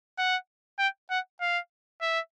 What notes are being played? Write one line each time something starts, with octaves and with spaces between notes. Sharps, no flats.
F#5
G5
F#5
F5
E5